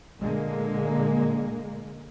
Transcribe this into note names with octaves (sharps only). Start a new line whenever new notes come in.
A#2 D3 G#3 A#3